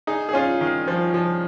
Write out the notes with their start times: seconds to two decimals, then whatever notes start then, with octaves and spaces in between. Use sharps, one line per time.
0.07 D#4 G#4
0.29 G#4
0.33 C#4 F4
0.61 D#3
0.87 F3
1.14 F3